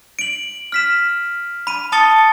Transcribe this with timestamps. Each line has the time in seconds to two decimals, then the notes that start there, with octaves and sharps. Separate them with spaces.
0.19 D7 F#7
0.72 F6 B6 E7
1.67 B5 D#7
1.92 A5 B5 D#6 A6 C#7 G7